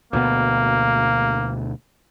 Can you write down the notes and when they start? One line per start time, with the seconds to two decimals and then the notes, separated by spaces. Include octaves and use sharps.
0.13 D2 B2 A#3 B3